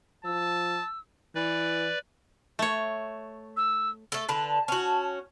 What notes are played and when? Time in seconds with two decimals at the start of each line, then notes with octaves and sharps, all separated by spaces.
0.25 F3 A5 E6
1.35 E3 B4 D5
2.59 A3 C#5
3.57 E6
4.12 A3 A4
4.29 D3 B4 A5
4.68 C#4 F#4